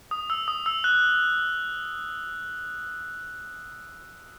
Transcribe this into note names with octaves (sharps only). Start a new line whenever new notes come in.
D#6
E6
D#6
E6
F#6